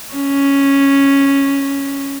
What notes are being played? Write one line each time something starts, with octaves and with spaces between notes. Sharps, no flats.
C#4